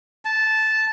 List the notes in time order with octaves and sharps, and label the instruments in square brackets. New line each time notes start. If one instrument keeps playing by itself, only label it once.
[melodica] A5